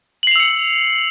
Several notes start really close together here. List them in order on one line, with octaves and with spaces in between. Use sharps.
F#7 C7 F7 E6 C#7